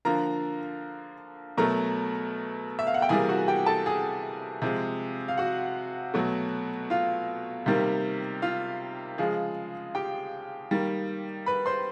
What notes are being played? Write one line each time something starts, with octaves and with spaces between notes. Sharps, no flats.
D3 F3 A#3 A#4 A#5
B2 F#3 A3 A#4 A#5
E5
F5
F#5
G5
C3 E3 G3 A#3 G#4 G#5
F#4 F#5
G4 G5
A4 A5
G#4 G#5
C3 F3 G#3
F5
F#4 F#5
B2 F#3 A3
F4 F5
C3 D#3 G3 A#3
F4 F5
C#3 F3 G#3
G4 G5
D#3 G3 A#3
B4 B5
C5 C6